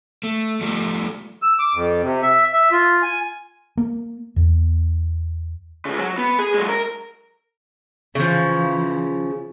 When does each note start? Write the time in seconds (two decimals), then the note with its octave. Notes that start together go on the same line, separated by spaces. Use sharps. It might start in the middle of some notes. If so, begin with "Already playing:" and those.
0.23 A3
0.61 F3 G3 A3
1.42 E6
1.59 D6
1.74 F2
2.03 C3
2.23 E5
2.53 E5
2.72 F4
3.02 G#5
3.77 A#3
4.36 E2
5.85 C#3 G#3
5.99 F#3
6.18 B3
6.39 G#4
6.54 F#3 G#3
6.68 A#4
8.15 C#3 E3 F3